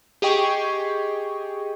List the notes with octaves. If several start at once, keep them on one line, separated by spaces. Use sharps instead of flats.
G4 G#4 D#5 G5 C#6